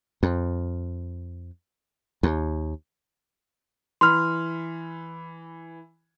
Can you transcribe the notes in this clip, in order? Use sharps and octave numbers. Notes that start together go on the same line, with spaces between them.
F2
D#2
E3 B5 C6 F6 F7